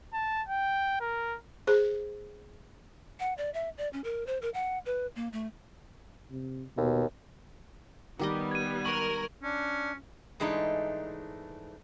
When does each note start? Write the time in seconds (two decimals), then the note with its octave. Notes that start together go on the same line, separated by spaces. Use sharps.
0.13 A5
0.49 G5
1.00 A#4
1.67 G#4 C5
3.20 F#5
3.38 D5
3.54 E5
3.78 D5
3.93 C#4
4.04 A#4
4.27 C5
4.42 A#4
4.54 F#5
4.86 B4
5.16 A#3
5.33 A3
6.30 C3
6.77 D#2 B2
8.19 D#3 G3 B3 G4 D#5
8.51 G#6 D#7
8.85 A#4 C#6 F#7
9.43 C#4 D4
10.40 G#2 E3 G#3 A3 D4 D#4